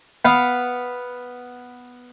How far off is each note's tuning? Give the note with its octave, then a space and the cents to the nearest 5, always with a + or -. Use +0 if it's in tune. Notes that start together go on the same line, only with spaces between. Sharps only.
B3 +0 F5 +0